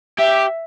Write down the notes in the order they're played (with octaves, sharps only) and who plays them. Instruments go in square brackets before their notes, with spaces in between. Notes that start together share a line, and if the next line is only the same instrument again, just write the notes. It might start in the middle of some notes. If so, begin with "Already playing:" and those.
[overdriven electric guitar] G4 [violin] E5